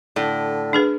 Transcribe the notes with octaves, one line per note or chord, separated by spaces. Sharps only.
A2 D3
D4 G#4 B4